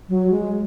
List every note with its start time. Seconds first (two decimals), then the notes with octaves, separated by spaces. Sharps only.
0.09 F#3
0.31 G#3